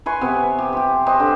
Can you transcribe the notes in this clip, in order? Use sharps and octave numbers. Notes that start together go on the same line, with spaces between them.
B4 G#5 C6 C#6
C3 B3
G4
G4 C5
G4 B4 C5 D#5
D3